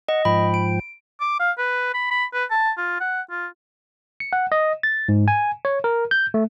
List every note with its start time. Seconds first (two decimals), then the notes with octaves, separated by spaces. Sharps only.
0.09 D#5 F#5
0.25 G#2 F3 G5 B5
0.54 D7
1.21 D6
1.40 F5
1.58 B4
1.94 B5
2.11 B5
2.34 B4
2.51 A5
2.77 F4
3.00 F#5
3.31 F4
4.20 C#7
4.33 F#5
4.52 D#5
4.83 A6
5.09 G#2
5.28 G#5
5.65 C#5
5.84 A#4
6.11 G6
6.34 A3